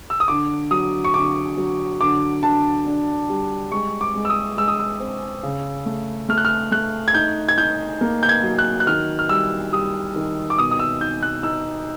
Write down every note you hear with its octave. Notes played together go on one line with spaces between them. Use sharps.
E6
D#6
D3 D6
F#3 D#6
C#6
D3 D6
F#3
D3 D6
D3 A5
D4
G3
G#3 C#6
D6
G#3
E6
D#6
G#3 E6
D#6
E6
C4
C#3
A3
A3 F6
F#6
F6
A3 F#6
G#6
D#4 G6
G#6
D#4 G6
A#3
G6
G#6
F#3
F#6
F#6
D#3 F6
F6
G3 E6
G3 D#6
D#3
D6
B2 D#6
D#6
E6
D#4 G6
F#6
D#4 E6